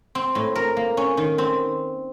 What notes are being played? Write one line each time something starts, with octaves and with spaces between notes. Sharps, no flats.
C4
A2
A#4
A#3
C#4
D#3
C4